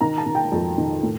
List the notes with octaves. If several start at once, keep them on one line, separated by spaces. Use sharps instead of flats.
D#3 A#5
A5
D#3
G5
F2
D#3
A2